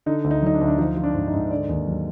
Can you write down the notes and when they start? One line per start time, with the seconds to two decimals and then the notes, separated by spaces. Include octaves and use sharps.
0.06 D3 D#4
0.24 D2
0.31 D#4
0.43 F#3 D#4
0.54 D4
0.61 D2
0.67 D4
0.78 F3 D#4
0.97 F3
1.04 D4
1.15 G#2
1.28 D#4
1.33 G#2
1.51 D3 D5
1.69 D#2
1.87 F#3